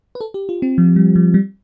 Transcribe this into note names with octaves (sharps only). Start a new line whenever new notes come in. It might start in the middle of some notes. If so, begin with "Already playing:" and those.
B4
A4
G4
F4
C4
F3
G3
F3
G3